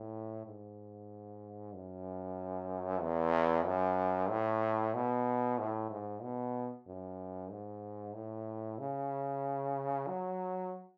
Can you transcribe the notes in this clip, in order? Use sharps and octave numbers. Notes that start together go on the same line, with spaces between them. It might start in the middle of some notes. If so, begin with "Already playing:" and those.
Already playing: A2
G#2
F#2
E2
F#2
A2
B2
A2
G#2
B2
F#2
G#2
A2
C#3
F#3